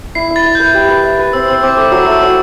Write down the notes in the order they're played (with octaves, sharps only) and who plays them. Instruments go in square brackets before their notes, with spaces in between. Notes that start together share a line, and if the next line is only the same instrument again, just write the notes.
[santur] E4 [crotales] C7
[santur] E4
[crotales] A6
[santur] E5
[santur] B4 [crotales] G6
[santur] G4
B4
E5
B4
[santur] C4 [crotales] E6
[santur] C4 [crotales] E6
[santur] C4 [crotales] D6
[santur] A3 [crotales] D6
[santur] F#3 [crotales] E6
[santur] A3
[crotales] E6
[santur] F#3